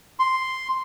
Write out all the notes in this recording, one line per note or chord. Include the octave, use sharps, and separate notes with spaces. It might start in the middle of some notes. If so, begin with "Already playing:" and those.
C6